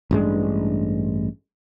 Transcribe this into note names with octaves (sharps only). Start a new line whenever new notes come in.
A1 G2 G#3 D4